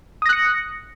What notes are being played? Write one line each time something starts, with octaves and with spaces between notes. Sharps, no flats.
D#6 F#6 A#6 C#7